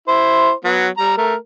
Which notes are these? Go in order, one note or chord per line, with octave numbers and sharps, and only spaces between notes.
E4 C5
F#3 B3
G3 A#5
A3 A#4